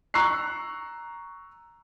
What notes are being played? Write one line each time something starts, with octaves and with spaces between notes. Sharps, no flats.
A#5 C#6 E6 F#6 C7